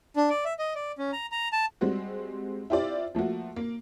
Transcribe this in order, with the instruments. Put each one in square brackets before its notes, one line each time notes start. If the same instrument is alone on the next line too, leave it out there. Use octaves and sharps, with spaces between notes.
[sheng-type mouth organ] D4
D5
E5
D#5
D5
C#4
A#5
A#5
A5
[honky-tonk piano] G3 G#3 C4 F#4
E4 F4 G4 C5 D5 E5
F3 A3 A#3 F#4
A#3